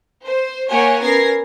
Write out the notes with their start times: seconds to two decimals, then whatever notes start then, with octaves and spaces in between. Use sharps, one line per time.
0.24 C5
0.70 A#3 G4 C#5 F#5 G#5
1.01 B3 C#4 A#4 G#6 A#6 C7